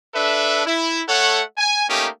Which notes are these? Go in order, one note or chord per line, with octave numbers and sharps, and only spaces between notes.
D4 A4 B4 E5
E4
A3 A4 C#5 F#5
G#5
A3 A#3 C#4 D#4 G4